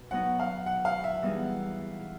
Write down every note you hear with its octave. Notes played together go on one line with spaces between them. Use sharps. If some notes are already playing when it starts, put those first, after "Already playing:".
Already playing: B2
F#3 B3 D#4 F#5
F5
F#5
F5
E5
E3 G3 B3 D#4 G#4